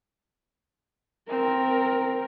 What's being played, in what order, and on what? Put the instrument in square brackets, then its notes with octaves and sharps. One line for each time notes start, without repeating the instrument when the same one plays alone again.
[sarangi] C4 [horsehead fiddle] A#4